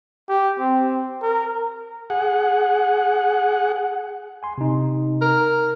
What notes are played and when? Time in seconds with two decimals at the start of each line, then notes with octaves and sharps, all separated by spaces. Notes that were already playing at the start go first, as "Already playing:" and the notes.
0.29 G4
0.59 C4
1.22 A#4
2.10 G#4 F#5
4.43 G#5 C6
4.58 C3 D#4
5.21 A#4